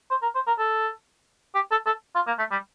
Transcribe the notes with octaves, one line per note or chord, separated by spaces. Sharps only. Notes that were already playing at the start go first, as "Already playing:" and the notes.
C5
A#4
C5
A#4
A4
G4
A4
A4
F4
A#3
A3
G3